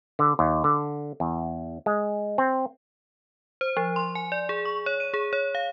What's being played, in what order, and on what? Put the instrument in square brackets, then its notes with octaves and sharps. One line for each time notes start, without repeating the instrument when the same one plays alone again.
[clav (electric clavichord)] D3
D#2
D3
E2
G#3
C4
[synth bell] C5
F3
C6
G#5
D5
G#4
C#6
C#5
D#7
G#4
C#5
F5